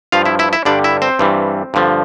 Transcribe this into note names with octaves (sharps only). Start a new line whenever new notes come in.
G2 F3 F4 F5
E4 E5
E4 E5
E4 E5
G2 D3 G3 D4 D5
E4 E5
C4 C5
G2 E3 G3
G2 D3 F3